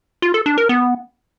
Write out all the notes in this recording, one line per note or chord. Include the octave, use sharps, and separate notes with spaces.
F4
A4
D4
A#4
B3